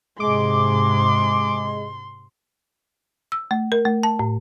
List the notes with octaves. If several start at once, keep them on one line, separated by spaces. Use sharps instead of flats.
G#2 C3 G#3 C6 D6
E6
A3
A#4
A3
A5
A2